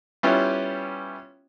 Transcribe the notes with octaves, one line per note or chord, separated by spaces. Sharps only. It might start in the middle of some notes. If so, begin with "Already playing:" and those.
G3 B3 C#4 E4 F4 G4